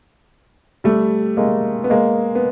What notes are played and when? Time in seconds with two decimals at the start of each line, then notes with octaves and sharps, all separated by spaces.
0.84 G3 A3
1.37 G#3 A#3
1.84 B3
1.90 G#3 A#3
2.35 B3